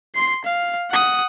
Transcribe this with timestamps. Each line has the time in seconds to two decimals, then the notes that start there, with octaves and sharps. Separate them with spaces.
0.15 C6 C7
0.45 F5
0.91 F#5 D#6